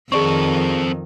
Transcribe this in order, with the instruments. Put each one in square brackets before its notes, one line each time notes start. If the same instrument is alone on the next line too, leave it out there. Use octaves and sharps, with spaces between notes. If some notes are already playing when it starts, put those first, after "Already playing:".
[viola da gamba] F2 D#3 [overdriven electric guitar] C4 A4 [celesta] G#4 D5 C#6